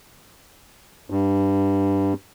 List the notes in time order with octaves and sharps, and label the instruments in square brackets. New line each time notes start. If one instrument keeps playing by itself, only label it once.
[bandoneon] G2